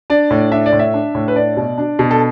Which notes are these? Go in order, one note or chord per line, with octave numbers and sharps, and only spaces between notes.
D4 D5
A2
D4 E5
D5
A2
E5
D4
A2
B4
D4 D5
B2
D4
B2
A4